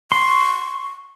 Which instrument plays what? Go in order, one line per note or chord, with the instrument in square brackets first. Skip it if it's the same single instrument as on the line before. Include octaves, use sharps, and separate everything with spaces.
[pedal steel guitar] C6 [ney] C#6